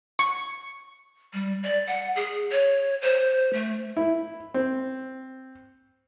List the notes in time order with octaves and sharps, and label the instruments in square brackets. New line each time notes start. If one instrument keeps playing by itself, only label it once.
[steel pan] C#6
[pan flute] G3
D5
F#5
G#4
C#5
C5
A3
[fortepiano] E4
C4